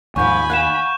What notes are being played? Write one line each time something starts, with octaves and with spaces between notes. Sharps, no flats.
D#2 G#2 F3 G#5 B5 C#6 G6
F5 F#5 F#6 E7